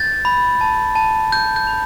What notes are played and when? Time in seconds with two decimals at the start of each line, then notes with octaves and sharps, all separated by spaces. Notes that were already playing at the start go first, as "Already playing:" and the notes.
Already playing: G6 A6
0.25 B5
0.61 A5
0.95 A5
1.32 G6
1.56 G6
1.67 B5